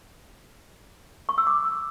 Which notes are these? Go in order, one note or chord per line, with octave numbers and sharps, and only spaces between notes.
C#6
E6
D6